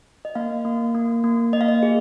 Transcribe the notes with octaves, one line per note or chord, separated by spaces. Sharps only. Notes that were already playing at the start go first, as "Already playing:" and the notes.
D#5
A#3 F5
A#3
A#3
A#3
A#3 D#5
F5
D#5
G#4